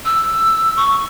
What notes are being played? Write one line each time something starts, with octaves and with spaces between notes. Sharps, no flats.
E6
C#6